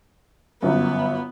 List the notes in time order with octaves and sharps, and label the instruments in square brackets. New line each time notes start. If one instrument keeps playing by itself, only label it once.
[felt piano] G1 F#2 [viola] B3